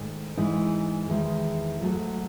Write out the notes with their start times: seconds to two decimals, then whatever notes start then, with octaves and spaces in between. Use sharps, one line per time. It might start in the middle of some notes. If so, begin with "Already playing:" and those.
Already playing: G#2 D#3 A3
0.37 G#2 E3 G#3 D#4
1.09 E2 D#3 G#3
1.80 G#2 F#3 A3